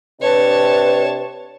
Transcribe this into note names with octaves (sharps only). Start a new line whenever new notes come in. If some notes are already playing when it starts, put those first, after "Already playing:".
C3 D4 B4 C#5 A5